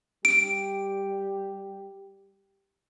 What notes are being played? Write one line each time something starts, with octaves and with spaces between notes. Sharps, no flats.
G3 G4 D7